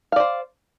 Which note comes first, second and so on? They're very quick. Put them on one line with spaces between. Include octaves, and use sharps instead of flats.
F5 D5 C5